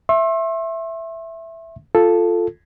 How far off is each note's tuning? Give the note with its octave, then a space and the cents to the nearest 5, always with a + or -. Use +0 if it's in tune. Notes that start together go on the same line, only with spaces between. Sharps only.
E5 +5 C6 +45
F4 +0 A4 +0